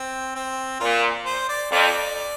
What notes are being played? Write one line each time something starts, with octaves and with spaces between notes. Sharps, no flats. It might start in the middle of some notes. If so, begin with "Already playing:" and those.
Already playing: C4
C4
A#2 F4
C5
D5
F2 D5